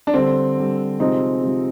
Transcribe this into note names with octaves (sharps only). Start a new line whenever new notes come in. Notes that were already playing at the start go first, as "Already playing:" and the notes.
D4
D3 G3 C4
D3 G3
C3 F3 G#3 C4 D#4
C3 F3 G#3